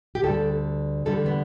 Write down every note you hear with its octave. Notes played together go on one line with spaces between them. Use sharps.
G4
D2 D3 G3 A4
E2 D3 G3 A4
B3